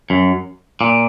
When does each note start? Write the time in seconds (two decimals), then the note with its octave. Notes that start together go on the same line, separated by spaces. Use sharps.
0.10 F#2
0.81 A#2